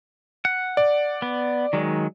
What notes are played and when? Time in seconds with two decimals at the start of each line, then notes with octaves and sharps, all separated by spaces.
0.45 F#5
0.77 D5
1.22 B3
1.73 D#3 F#3 G#3